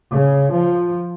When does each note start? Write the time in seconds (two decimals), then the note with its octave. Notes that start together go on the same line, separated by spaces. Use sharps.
0.13 C#3
0.52 F3